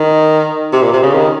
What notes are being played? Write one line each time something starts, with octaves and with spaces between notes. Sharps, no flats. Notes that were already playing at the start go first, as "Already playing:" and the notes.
Already playing: D#3
C3
A#2
C3
C#3
D#3